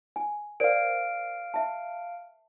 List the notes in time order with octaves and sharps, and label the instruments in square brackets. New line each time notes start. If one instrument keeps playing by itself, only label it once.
[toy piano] G#5
[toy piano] A#4 C5 D5 [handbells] F5 D7
[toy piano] E5 A5